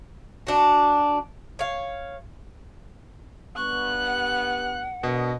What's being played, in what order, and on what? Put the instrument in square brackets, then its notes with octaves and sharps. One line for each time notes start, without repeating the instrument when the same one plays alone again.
[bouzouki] D4 F#4
C#5 F5
[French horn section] G2 B3 [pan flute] C#6 [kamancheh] F#6
[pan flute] F#5
[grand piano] B2 [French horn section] D4 A#4 D#5